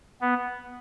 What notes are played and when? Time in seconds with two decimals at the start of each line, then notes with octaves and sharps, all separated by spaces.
0.21 B3